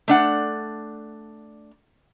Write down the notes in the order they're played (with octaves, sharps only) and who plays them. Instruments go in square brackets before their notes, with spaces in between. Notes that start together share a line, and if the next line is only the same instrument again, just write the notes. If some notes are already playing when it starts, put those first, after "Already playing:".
[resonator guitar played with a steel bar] A3 D4 F#5